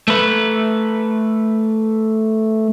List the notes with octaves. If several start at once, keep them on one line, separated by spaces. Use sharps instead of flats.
A3 B4